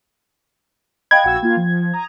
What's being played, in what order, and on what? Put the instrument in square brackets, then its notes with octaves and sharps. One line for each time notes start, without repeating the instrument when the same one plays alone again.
[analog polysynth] D#5 F#6 [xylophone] F5 G5 B5 [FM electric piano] G#6
[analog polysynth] A#1 F#4 E6 [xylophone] F#5
[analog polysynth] A#3 F4
F3
A#5 D#6